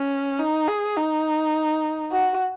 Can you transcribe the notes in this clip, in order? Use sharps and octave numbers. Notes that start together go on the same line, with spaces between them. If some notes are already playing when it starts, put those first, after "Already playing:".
Already playing: C#4
D#4
G#4
D#4
F#4